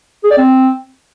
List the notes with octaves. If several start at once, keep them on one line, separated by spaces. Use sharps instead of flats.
G#4
D5
C4